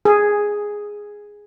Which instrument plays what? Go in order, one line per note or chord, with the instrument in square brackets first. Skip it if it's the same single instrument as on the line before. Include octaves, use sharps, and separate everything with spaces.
[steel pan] G#4